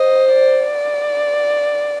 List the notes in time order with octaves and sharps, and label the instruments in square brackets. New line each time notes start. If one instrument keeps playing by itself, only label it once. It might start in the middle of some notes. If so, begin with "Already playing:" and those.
Already playing: [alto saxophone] C5 [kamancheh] D#5
[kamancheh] D5